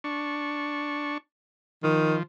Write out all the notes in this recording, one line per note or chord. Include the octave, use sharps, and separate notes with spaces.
D4 C#6
D#3 F3